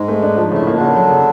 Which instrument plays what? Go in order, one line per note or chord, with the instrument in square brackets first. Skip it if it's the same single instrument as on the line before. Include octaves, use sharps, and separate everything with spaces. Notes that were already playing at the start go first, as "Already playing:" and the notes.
Already playing: [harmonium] G#2 G#3
[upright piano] A3
D4
F3
[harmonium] A2 A3 [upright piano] C#3
[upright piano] A#3
[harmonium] D3 D4
[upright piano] C#3
F#3
C#3